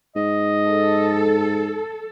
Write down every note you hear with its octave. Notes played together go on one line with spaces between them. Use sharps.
G#2 D#5
A4